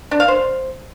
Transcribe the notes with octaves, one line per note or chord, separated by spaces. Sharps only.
D4
F5
C5